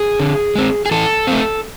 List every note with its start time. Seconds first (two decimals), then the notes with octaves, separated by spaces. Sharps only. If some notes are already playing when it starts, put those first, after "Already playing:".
Already playing: G#4
0.20 D3
0.55 G#3 C4
0.86 G#4
0.91 E3 A4
1.27 A3 C4